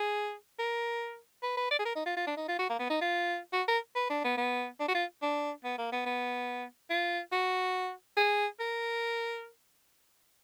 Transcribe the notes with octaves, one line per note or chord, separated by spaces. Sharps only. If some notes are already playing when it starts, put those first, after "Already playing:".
Already playing: G#4
A#4
B4
B4
D5
G#4
A#4
D#4
F4
F4
D4
D#4
F4
F#4
A#3
B3
D#4
F4
F#4
A#4
B4
D4
B3
B3
D4
F#4
F4
D4
B3
A#3
B3
B3
F4
F#4
G#4
A#4